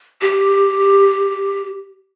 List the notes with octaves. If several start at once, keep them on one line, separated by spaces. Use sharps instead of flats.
G4